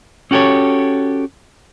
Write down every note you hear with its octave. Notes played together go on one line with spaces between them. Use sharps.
C#4 F#4 G4 A4 C#5